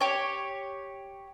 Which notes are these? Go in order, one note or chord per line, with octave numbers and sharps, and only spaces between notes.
G4 C#5